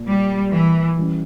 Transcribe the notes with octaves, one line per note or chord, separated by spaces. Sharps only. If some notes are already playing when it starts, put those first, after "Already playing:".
Already playing: A#2 A#3
G3
E3
E3 G3 C#4